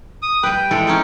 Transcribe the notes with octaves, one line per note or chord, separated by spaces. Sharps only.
D#6
G3 B4 G5
E3 G#3 A4
C#4 D#4 A4